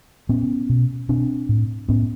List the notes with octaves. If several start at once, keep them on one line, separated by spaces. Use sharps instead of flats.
A#2 B3 C#4
B2
B2 C4 D4
A2
A2 B3 C#4